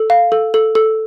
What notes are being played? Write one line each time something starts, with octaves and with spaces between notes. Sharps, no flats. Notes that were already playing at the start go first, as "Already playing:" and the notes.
Already playing: A4
F5
A4
A4
A4